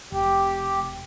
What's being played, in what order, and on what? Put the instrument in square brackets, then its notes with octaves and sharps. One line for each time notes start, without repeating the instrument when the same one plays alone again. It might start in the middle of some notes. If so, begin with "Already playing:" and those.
[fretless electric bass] F1 [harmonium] G4